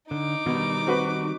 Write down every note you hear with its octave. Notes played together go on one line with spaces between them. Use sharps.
D3 D#4 D6
B2 D#3 G3
C4 F#4 B4